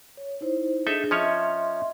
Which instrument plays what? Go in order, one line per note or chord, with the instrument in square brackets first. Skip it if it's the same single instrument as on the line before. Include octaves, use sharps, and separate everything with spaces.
[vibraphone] C#5
D#4 E4 C5
[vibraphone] D4 G#4 [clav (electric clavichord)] D#4 A4 E5
[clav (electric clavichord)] F3 C#4 C#5 [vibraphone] D#5 E5 C6